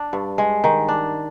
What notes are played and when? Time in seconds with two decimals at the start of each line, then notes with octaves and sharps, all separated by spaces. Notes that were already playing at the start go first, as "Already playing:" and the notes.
Already playing: D4
0.13 G2
0.38 G#3
0.64 D#3
0.88 D4